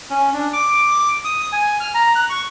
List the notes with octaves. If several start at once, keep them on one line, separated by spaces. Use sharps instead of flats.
C#4
D4
D6
D#6
G#5
F6
A#5
F#6
C#6